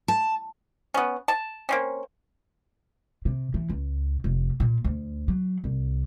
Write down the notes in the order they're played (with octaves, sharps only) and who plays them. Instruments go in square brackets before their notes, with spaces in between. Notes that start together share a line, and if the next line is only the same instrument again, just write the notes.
[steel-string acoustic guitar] A5
[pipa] B3 C#4
A5
A#3 C4 C#4
[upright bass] C3
E3
C#2
F1
A#2
D2
F#3
C2